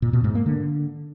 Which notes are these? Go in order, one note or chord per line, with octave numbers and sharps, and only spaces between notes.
A#2
B2
G#2
A#3
D3